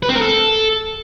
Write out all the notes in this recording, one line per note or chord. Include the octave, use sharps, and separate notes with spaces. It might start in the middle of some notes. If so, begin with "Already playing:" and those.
B4
C4
A#4
A4